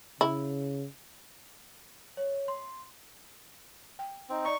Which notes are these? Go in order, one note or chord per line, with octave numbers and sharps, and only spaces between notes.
C#3 E4
C#5
C6
G5
C4 D#4
D5 A#5 C#6